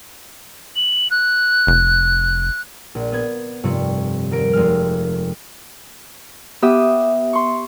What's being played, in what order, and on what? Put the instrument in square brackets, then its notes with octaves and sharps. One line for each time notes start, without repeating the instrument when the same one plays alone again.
[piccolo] F#7
F#6
[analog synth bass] F1
[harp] A#1
B3 G#6
F1 G2 C3 F3 C#6
D#1 A#4 D7
F1 G#3 F6
B3 G4 E5 D#6
C6 C#6